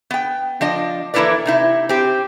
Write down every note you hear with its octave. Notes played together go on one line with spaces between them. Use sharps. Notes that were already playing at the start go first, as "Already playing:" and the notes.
B3 G5
F3 D4 D#5
E3 A#3 E4 A4 B4 D5
C3 D#4 E4
C4 G4